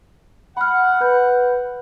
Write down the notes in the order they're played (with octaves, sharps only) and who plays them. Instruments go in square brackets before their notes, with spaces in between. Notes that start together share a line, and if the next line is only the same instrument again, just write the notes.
[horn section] F#5 [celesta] B5 F6
[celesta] B4 B5 G6